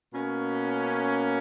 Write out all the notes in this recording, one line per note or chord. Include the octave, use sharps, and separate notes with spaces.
B2 A#3 C#4